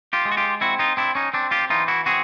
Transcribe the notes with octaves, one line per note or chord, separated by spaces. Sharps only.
F4 G4
G#3
F#4
F4 G4
C4 E4 F#4
D#4 F4
C4 D4 E4
C#4 D#4
C4 D4
F4 G4
E3 D#4 F4
E4 F#4
C4 F#4 G#4